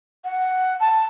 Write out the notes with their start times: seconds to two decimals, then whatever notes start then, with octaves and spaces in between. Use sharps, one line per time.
0.25 F#5
0.80 A5